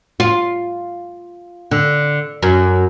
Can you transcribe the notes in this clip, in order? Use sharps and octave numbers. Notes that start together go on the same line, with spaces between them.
F4
D3
F#2